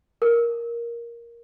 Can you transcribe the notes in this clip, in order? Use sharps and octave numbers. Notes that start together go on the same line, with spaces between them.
A#4